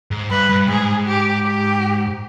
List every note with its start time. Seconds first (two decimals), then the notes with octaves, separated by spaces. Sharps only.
0.11 G#2
0.30 G2 B4
0.49 G2
0.68 G#2 G#4
1.06 G4
1.45 G4